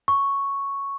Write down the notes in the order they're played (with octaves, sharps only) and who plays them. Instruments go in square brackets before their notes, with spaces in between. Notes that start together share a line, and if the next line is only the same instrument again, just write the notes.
[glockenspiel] C#6